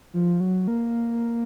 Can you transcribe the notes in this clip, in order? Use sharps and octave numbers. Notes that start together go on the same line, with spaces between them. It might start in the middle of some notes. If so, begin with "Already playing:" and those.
F3
F#3
A#3